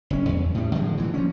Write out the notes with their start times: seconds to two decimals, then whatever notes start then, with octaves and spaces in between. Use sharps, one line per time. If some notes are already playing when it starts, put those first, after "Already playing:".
0.10 F#1 C#4
0.29 E2
0.55 A2 G3
0.75 D3 F3 G#3
0.97 G2 A#2 E3
1.14 F3 C#4